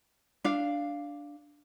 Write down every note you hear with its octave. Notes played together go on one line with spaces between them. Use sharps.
D4 F5